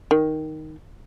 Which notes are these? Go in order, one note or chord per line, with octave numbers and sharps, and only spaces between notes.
D#3